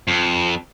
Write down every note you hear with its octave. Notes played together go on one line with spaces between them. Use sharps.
F2